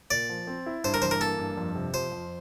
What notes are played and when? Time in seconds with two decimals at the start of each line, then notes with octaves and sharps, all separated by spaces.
0.11 A#2 D5
0.29 F3
0.47 C4
0.66 E4
0.84 G2 C5
0.94 A#4
1.02 E3 C5
1.11 A#4
1.20 A#3 A4
1.39 G2
1.57 F2
1.75 C3
1.93 F3 C5
2.12 F2